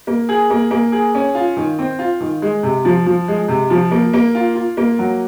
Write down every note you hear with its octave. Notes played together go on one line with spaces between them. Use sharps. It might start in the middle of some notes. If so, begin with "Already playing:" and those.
A#3
G#4
A#3
A#3
G#4
C#4
F4
D#3
C4
F4
D#3
G#3
C3
F3
F3
G#3
C3
F3
A#3
A#3
F4
F4
A#3
F#3